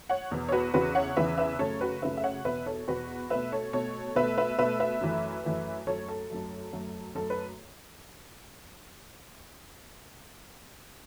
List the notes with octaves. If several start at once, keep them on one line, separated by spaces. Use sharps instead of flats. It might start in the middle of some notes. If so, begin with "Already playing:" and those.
C#5 F#5
E2 B2 B3
C#5
F#4 B4
E2 C#3 E3 F#4 B4
C#5 F#5
E2 C#3 E3 B4 E5
B4 E5
F#2 C#3 A3 A4 C#5
F#4 B4
F#2 C#3 A3 B4 E5
E5
C#5 F#5
E2 B2 B3 B4 E5
A4 C#5
E2 B2 B3 F#4 B4
B2 A3 B4 E5
A4 C#5
B2 A3 A4 C#5
B2 A3 B4 E5
B4 E5
B2 A3 B4 E5
B4 E5
F#2 E3 A3
F#2 E3 A3
F#2 F#3 A3 A4 C#5
A4
F#2 F#3 A3
F#2 F#3 A3
F#2 F#3 A3 A4
B4